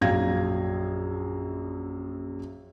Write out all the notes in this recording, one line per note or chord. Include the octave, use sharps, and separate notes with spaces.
A#1 F#2 F5 G#6 A#6